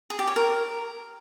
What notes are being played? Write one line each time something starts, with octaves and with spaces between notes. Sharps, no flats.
G#4
G4
C#5
A#4